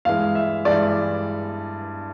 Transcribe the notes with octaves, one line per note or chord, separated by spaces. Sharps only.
G2 E3 G#3 F5
E5
G2 E3 G#3 D5